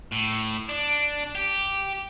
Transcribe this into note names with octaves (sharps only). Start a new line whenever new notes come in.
A2
D4
G4